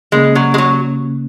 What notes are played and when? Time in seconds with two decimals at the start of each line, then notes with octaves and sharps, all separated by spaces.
0.12 C#3 G#3 A#3 C#4
0.35 F#3
0.54 G#3
0.58 F#3